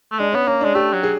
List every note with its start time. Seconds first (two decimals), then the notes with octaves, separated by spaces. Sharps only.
0.12 A3
0.19 G#3 D4
0.33 C#4
0.35 B3
0.47 A#3 C#4
0.61 D4
0.65 G#3
0.74 A3 G4
0.93 F#3
1.03 G#4